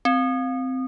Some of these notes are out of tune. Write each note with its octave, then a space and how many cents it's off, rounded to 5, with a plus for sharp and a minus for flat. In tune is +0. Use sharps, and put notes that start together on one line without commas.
C4 -10